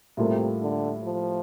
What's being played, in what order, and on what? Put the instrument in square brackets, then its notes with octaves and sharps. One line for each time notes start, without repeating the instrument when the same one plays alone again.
[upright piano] A2 G3 A#3 F4 A4 [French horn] C3
[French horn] D3
F3